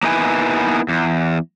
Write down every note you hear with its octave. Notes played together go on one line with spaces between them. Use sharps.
A#3 B3 D#4 E4 B4 G#5
E2